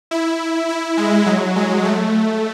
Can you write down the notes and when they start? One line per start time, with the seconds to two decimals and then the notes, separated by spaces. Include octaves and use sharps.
0.11 E4
0.69 E4
0.97 G#3
1.26 F#3
1.56 G#3
1.85 A3